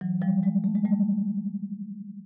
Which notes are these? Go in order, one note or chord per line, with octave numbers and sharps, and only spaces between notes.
E3 F#3
F3 G3
F#3 G#3
A3
G#3
G3 A3